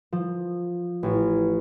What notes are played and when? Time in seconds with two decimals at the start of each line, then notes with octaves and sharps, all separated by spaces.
0.12 F3
1.03 A1